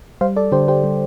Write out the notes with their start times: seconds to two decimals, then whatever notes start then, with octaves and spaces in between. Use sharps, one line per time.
0.21 G3 C5 F5
0.36 A4 D5
0.52 D3 G4 C5
0.68 G4 C5
0.84 G3